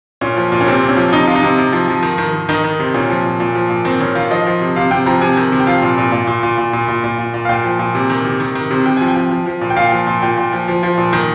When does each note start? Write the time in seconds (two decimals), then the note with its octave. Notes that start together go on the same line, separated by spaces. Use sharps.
0.21 A#2 C#4
0.37 F3
0.52 A#2
0.61 C#4
0.67 C3 C4
0.82 C3
0.89 C#4
0.97 F3
1.12 C3 D#4
1.27 C3 F4
1.35 D#4
1.43 C3
1.58 C3
1.73 F3
1.88 F3
2.03 D#3
2.18 D#3
2.34 D#3
2.49 D#3 D#4
2.64 D#3
2.79 C3
2.94 A#2 C#4
3.10 F3
3.25 A#2
3.40 A#2
3.55 F3
3.70 A#2
3.85 D#3 C4
4.00 D#3 C#4
4.15 D#3 F4
4.30 F3 D#5
4.46 F3
4.61 C3
4.76 C3 F5
4.91 C3 G5
5.06 F3 A#5
5.21 C3 G#5
5.37 D#3
5.52 C3
5.60 G5
5.67 F3 F5
5.82 A#2
5.98 A#2
6.12 A#2
6.27 A#2
6.43 A#2
6.58 A#2
6.73 A#2
6.88 A#2
7.04 A#2
7.18 A#2
7.34 A#2
7.45 F5
7.49 A#2 G5
7.64 F3
7.79 A#2
7.95 C3
8.10 D#3
8.25 C3
8.40 D#3
8.55 D#3
8.70 C3
8.85 C3 G5
8.97 F3 G#5
9.08 G5
9.16 F3
9.31 F3
9.46 F3
9.61 A#2
9.70 G5
9.76 A#2 F5
9.92 F3
10.07 A#2
10.22 A#2 G5
10.37 A#2
10.53 F3
10.68 F3
10.83 F3
10.98 A#2
11.13 D#3